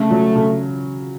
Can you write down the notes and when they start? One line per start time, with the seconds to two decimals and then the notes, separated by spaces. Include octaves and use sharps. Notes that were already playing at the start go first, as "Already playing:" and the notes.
Already playing: C#3 A3
0.11 F#3
0.35 C#3